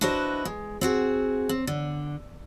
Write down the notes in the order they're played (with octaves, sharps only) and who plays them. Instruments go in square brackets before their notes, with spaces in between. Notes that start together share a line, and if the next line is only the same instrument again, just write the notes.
[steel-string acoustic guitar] D4 E4 F#4 B4 C5 D#5
G#3
C4 F#4 G#4
C4
D3